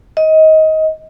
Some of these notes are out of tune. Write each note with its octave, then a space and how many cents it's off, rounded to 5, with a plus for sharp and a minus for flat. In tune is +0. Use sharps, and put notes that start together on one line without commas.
D#5 +20